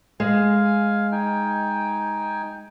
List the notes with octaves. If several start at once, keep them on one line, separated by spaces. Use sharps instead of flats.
G#3 F5 G#5
D#4 G5 G#5